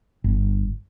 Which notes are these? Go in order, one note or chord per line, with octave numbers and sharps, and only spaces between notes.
G1